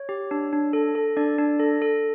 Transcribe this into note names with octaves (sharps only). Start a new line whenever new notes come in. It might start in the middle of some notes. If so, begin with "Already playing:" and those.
Already playing: C#5
G4
D4
D4
A4
A4
D4 D5
D4
A4
A4